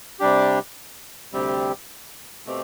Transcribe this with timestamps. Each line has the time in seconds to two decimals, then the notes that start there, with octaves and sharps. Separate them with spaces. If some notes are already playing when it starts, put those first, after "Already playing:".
0.20 C3 G3 D4 G4
1.32 D2 C3 G3 C4 G4
2.46 B2 A3 C4 G4